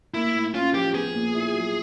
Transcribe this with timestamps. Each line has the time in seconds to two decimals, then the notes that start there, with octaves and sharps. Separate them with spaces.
0.14 A#3 E4
0.34 A2
0.54 C#4 F4
0.74 F3 G4
0.94 B3 G#4
1.14 A#2
1.35 E4
1.54 F#3